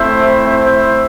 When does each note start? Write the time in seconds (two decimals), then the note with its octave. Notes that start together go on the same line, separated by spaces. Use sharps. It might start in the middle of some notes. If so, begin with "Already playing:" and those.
Already playing: A3 C4 E4 C5 E5
0.47 C5 E5